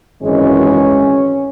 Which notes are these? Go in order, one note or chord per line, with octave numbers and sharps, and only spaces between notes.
G#1 F#2 E3 G#3 C#4